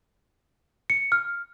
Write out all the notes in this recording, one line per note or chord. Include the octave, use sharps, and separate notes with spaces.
C#7
F6